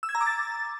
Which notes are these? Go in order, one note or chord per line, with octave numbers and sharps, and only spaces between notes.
E6
G#6
A#5
D6
A6